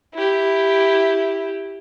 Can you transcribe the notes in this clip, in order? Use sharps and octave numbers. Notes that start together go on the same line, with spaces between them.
E4 G4